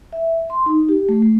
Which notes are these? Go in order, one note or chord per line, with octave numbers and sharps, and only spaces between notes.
E5
C6
D#4
G4
A3
A3